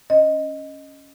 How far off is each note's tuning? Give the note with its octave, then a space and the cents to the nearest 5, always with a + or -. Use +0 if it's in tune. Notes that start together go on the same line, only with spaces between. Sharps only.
C#4 +0 D#5 +0